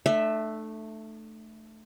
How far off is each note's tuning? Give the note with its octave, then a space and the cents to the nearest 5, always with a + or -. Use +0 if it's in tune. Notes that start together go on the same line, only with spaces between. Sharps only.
A3 +0 D4 +45 E5 +0